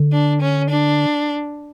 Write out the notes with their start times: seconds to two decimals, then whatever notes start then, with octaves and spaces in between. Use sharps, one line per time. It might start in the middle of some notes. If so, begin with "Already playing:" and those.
Already playing: D3
0.12 D4
0.41 C#4
0.70 D4